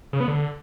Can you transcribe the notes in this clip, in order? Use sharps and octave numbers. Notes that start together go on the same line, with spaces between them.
C#3
B3
D3